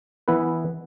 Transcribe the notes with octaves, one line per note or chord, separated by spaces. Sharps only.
E3 B3 E4 B4